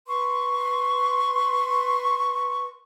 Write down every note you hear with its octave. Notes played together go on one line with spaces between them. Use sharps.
B4 C6 C#6